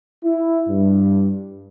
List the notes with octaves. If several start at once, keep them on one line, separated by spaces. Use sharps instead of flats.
E4
G2